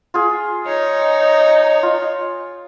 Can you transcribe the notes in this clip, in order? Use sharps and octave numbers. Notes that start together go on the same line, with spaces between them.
F4 G#4
D#4 C#5
F4